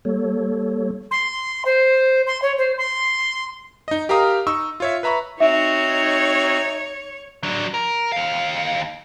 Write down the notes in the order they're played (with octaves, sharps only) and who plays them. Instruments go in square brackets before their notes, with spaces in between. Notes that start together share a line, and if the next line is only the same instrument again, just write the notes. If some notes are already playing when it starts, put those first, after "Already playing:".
[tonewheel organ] G3 A#3 A4 C#5
[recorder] C6
C5
C6
C#5
C5
C6
[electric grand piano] D#4 D#5
G4 A#4 F5 A#5 D#6
D#4 C#6 E6
F4 C#5 E5
B4 E5 A#5 B5 C#6
[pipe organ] C4 F#4 [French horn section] D#4 [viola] C#5 [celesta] E5
[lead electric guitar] F#3 D4
A#4
D#2 F5